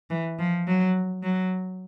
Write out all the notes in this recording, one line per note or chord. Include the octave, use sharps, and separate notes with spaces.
E3
F3
F#3
F#3